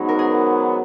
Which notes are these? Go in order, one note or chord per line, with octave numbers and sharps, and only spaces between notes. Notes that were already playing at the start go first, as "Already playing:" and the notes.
Already playing: G#2 F#3 B3 C#4 D#4
A#4
G#4